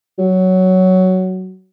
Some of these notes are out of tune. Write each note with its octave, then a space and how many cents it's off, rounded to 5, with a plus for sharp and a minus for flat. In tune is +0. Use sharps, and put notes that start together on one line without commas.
F#3 +10